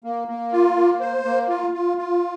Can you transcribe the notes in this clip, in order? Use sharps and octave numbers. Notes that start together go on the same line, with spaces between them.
A#3
A#3
F4
A#3
C5
A#3
F4
F4
F4